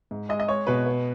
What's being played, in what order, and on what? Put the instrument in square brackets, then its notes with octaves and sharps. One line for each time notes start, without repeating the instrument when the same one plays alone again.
[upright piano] G#2
G#3 D#5
D#5
G#3 C#5
B2 B4
B3